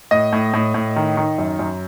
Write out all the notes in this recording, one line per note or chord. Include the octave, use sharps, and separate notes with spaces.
A2 D#5
A2
A2
A2
D#3
D#3
F#2
F#2